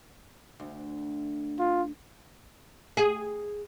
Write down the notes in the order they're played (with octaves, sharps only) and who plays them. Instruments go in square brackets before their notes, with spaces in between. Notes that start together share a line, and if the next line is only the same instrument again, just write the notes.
[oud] D2
[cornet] F4
[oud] G#4